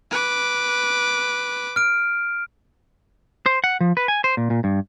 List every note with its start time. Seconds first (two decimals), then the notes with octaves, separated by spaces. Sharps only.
0.11 B4 D6
1.76 F6 D7
3.46 C5
3.64 F#5
3.81 F3
3.97 B4
4.08 G#5
4.24 C5
4.37 A#2
4.50 A#2
4.64 G2